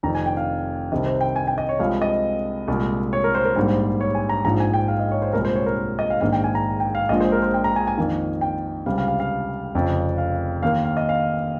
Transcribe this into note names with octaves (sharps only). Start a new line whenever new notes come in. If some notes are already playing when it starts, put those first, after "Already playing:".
F1 F2 D#3 A#5
G#5
G5
F5
C2 C3 D#3 D#5
C5
G5
G#5
G5
D#5
C#5
C2 C3 F3 G#3 F5
D#5
C2 A#2 G#3
C#5
A#4
C5
A#4
A#1 G#2 G3 A#3 C5
C#5
G#5
A#5
A#1 G#2 F3 A#5
G#5
G5
F5
D#5
C#5
C5
C2 A#2 G#3 A#4
C5
C#5
A#4
D#5
F5
A#1 G#2 D#3 A#3 F5
G5
G#5
A#5
G5
F5
A#1 A#2 F3 G#3 D#5
C5
A#4
C5
G5
A#5
G#5
G#5
F2 D#3 A#3
G5
C#2 C3 G3 F5
F5
F5
F5
F1 F2 C#3 F3
F5
D#2 D#3 A#3 F5
F5
D#5
F5